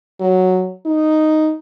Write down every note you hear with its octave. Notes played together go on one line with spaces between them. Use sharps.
F#3
D#4